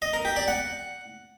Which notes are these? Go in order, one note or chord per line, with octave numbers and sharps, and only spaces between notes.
D#5
A#4
G4
D5
F#5